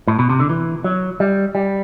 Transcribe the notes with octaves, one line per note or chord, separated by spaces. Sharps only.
A2
B2
C3
D3
E3
F#3
G3
G3